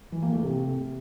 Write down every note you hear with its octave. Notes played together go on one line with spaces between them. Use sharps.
E3
A#3
A3
C3